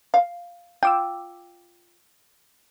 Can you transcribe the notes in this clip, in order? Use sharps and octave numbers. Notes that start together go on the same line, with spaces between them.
F5
F4 G5 D6 E6